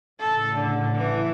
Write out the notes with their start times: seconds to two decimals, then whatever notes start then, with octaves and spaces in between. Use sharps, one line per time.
0.20 A1 A2 C#3 A4
0.54 D3
0.96 E3